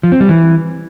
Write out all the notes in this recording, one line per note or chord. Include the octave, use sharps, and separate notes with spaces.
F3
C4
G3
E3